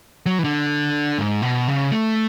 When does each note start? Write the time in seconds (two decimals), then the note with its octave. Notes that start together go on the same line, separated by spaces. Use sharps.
0.26 F#3
0.39 E3
0.44 D3
1.18 G#2
1.42 B2
1.68 C#3
1.91 A3